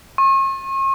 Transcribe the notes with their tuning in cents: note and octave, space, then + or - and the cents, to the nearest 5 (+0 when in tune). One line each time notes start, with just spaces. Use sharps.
C#6 -40